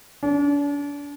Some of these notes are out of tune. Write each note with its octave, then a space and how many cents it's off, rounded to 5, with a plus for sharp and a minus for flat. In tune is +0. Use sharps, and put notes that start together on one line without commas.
D4 -40